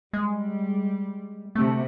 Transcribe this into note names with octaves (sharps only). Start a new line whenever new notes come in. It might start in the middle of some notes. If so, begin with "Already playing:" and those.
G3 G#3
D2 C3 A3